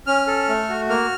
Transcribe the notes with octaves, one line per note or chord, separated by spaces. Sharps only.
C#4 F6
A4
A3
F#4
A#3 F6